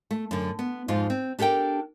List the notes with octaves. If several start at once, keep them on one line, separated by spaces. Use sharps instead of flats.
A3
F#2 D3
B3
F2 G#2 F3 F4
C4
D4 G4 A4 A#4 G5